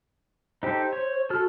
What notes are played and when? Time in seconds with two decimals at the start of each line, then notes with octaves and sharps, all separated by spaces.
0.63 D#4 G4 A4 C5
0.93 C#5
1.30 F#4 A4 F6